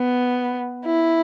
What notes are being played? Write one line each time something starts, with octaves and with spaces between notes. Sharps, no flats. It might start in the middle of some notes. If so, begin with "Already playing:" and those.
Already playing: B3
E4